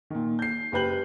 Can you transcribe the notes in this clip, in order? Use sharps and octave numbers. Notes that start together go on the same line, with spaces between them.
A#2 D#3
G6 C7
F#1 G4 B4 G6 F#7